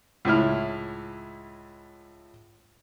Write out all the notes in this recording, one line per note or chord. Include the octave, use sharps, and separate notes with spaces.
C#2 A2 E4 F6